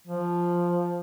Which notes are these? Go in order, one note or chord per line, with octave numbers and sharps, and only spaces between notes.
F3